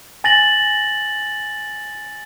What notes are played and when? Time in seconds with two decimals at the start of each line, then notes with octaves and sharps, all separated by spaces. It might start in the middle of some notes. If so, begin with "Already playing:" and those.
0.24 G#5 A6 A#6 F#7